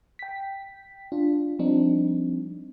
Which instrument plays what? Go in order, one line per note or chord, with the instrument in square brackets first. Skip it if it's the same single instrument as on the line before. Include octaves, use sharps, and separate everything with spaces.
[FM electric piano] G5 B6
D4 F4
F3 G3 C4 D4 D#4